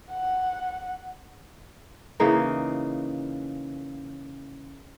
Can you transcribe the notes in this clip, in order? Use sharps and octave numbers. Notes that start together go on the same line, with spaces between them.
F#5
C#3 E3 A#3 D#4